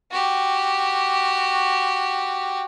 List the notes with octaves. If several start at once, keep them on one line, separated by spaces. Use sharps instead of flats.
F#4 G4